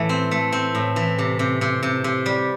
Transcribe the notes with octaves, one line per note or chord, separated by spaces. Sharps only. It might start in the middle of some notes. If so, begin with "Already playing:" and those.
Already playing: A2 E3 A3
C4
A3
C4
A2
E3
C3
C3
C3
C3
C3
G3